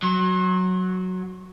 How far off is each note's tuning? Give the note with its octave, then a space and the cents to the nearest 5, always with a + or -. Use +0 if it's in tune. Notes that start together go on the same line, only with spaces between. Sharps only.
F#3 +0 C6 +40